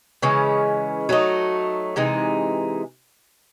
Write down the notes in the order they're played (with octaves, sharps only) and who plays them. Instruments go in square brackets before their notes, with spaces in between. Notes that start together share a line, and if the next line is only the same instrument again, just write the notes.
[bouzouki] C#3 E3 G#3 C#4
F#3 A3 D#4
C3 E3 G#3 D#4